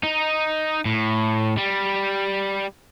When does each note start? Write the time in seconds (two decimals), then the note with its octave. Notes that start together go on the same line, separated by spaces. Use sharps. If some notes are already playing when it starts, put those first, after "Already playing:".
0.03 D#4
0.85 A2
1.58 G3